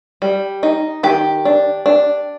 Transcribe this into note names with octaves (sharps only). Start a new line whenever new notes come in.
G3
D#4
D#3 G4
D4
D4